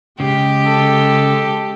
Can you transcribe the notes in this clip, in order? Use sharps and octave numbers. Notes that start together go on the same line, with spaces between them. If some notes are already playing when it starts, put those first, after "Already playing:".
C#3 G#3 G4
A4